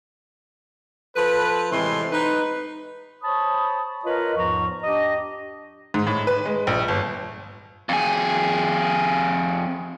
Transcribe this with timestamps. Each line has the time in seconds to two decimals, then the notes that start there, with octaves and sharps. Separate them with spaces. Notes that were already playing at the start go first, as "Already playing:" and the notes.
1.16 F3 A4 B4
1.72 A2 C3 E3 G#3 C6
2.13 D#4 B4
3.22 C5 C#5 A5 B5 D#6
4.05 F4 A#4 B4 C#5 D#5
4.37 E2 G#2 F3 A#5 C#6
4.84 D4 G4 D#5
5.94 G#2
6.07 A2
6.27 B4
6.45 G#3
6.67 A#1
6.88 G1
7.89 F2 G#4